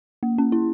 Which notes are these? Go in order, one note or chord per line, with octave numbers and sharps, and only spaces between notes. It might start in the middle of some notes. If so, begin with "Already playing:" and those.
A#3
C#4
E4